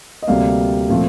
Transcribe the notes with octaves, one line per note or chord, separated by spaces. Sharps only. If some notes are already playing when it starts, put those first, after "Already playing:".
D#5
D2 C3 G3 A#3 D5 F5
A#2 F3 A3 C4 F4